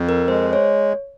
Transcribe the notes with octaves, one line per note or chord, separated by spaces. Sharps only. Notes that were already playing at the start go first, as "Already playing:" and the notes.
Already playing: F2
A#4
G#3 C5
C#5